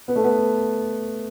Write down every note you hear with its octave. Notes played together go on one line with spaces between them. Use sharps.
B3
A3
B3